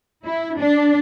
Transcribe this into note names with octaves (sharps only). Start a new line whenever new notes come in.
E4
D4